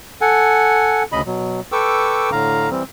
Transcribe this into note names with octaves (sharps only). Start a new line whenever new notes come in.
A4 F#5 G#5
D2 C#3 D#5 B5
B2 F#3
A4 B4 G5 C#6 D6 E6
A2 D3 F5 A#5
E3 G3 C4